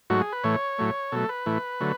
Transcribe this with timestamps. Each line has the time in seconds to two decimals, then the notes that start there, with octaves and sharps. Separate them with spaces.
0.10 G#2 F#3 A3 F#4
0.21 G#4
0.32 B4
0.44 A2 E3 A3 C#5
0.78 A2 F#3 A3
1.12 B2 F#3 A3 A4
1.29 B4
1.46 A2 E3 A3
1.80 D3 F#3 A3